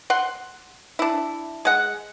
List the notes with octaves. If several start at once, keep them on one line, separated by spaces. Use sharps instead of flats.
F#5 C6
D4 E4
G#3 F#5